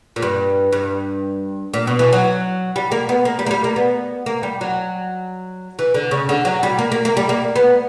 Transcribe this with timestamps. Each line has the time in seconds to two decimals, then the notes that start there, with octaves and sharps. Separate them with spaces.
0.16 A#2
0.22 G2
0.73 G2
1.74 A#2
1.87 B2
1.99 E3
2.13 F#3
2.76 G3
2.92 A#3
3.09 B3
3.25 A#3
3.39 G3
3.46 A#3
3.51 G3
3.64 A#3
3.76 B3
4.26 A#3
4.43 G3
4.61 F#3
5.79 E3
5.94 D3
6.11 C#3
6.29 D3
6.45 F#3
6.63 G3
6.79 A#3
6.92 A#3
7.05 A#3
7.17 G3
7.29 A#3
7.56 B3